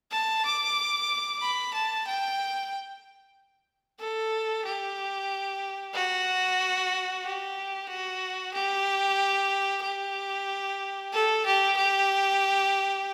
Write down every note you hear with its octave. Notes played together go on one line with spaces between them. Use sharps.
A5
D6
B5
A5
G5
A4
G4
F#4
G4
F#4
G4
G4
A4
G4
G4